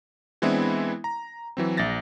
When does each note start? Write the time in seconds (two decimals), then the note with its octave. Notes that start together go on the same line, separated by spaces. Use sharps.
0.42 E3 G#3 B3 C4 D4 E4
1.04 A#5
1.57 E3 F#3 C4
1.77 A#1 E5 A6 A#6